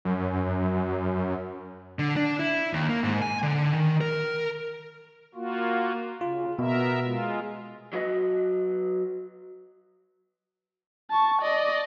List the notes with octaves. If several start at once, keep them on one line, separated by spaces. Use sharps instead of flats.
F#2
D3
D4
E4
D#2
A#3
G#2
G#5
D3
D#3
A#4
A#3 F4 F#4
C#3 F4
B2 B3 A#4 E5
G#3 F4
F#3 F#4 B4 D#5
A5 C#6
D5 D#5